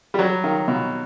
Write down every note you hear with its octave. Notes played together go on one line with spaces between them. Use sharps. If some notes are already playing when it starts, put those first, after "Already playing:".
G3
F#3
D#3
B2